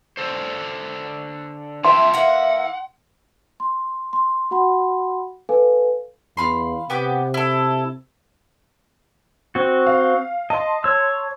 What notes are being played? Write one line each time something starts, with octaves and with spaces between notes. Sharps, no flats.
D3 A4 C5
F4 E5 G5 A5 C6
E3 A#3 E5 F#5
C6
C6
F#4 F#5 B5 C6
A4 B4 F5 G#5
E2 F5 B5 C6
C3 B3 G4 D6
E4 A4
C4 F#4
F5
D#5 A5 C6
C#5 E6